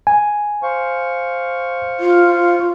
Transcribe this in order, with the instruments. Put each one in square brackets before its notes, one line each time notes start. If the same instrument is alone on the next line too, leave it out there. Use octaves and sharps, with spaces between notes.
[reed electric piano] G#5
[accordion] C5 F5 C#6
[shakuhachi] F4